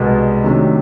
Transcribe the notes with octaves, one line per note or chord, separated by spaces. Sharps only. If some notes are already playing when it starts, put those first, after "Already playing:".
Already playing: C2 B2 G#3 B3
C3 D#3 F#3 A3 D4